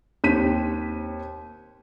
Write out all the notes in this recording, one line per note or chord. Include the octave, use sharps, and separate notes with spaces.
D#2 C4 B6 D#7